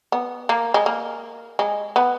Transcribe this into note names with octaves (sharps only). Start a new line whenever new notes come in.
B3
A#3
G#3
A#3
G#3
B3